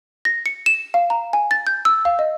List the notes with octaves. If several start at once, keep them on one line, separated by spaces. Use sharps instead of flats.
A#6
C#7
E7
F5
A#5
G#5
A6
G6
E6
F5
D#5